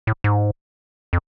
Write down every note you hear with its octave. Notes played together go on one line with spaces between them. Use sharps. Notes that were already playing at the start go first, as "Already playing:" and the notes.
A2
G#2
F2